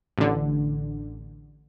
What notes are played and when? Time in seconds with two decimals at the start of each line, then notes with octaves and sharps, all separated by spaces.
0.18 A1 D3